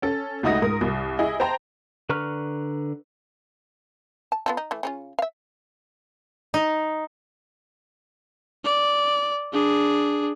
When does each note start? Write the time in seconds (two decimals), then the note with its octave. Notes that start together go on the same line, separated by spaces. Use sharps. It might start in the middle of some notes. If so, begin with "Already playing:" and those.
0.02 C#4 A4
0.43 C#2 A3 D#4 F#4 D#6 A#6
0.62 G#2 A#4 D#6
0.81 C2
1.19 E4 G#4 D#5
1.40 C5 G5 A5 A#5
2.09 D3 B4 A#5 C#6 F6
4.32 A5
4.46 B3 F4 A4
4.57 D#4
4.71 E3 A3
4.83 C#3 C#4 F4
5.19 E5 F5
6.54 D#4
8.64 D5
9.53 D4 G#4